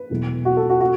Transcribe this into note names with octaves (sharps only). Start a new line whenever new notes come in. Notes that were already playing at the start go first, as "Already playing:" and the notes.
Already playing: B4
E1 E2 B2 F#3 A3
F#4
A4
F#4
F#4